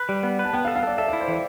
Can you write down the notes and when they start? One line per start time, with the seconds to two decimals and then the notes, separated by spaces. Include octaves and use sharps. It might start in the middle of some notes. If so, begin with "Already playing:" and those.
Already playing: B4
0.09 G3
0.23 B3
0.39 B4
0.44 A5
0.53 B3 G5
0.65 F5
0.68 A4
0.76 F5
0.83 A4 D5
0.98 A4 E5
1.08 E4 D5
1.20 C5
1.28 E3 D5